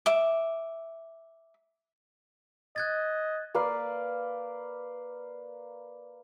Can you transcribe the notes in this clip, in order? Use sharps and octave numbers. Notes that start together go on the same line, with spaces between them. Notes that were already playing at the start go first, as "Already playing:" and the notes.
E5 D6
D#5 F#6 G#6 A6
A#3 B4 D5 F5